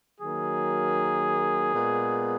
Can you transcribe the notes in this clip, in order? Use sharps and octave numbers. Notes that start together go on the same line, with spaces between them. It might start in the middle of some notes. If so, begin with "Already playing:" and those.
D#3 F#3 A#3 G#4
A#2 G#3 B3